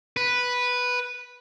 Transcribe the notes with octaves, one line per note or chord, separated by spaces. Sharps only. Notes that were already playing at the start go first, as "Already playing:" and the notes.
B4